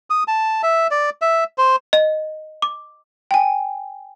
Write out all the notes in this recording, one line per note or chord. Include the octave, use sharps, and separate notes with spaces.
D#6
A5
E5
D5
E5
C5
D#5
D6
G5 G#5